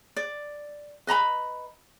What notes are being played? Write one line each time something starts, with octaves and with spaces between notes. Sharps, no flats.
D5
B4 D#5 A#5 B5